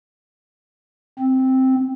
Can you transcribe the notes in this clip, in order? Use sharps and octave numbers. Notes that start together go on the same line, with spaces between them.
C4